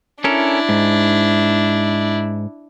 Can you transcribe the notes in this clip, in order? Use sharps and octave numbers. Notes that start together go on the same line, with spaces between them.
C#4 D4 E4 A4 A#4
G#2